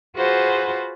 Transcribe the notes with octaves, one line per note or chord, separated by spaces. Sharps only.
F4 F#4 G#4 B4 C5 F#5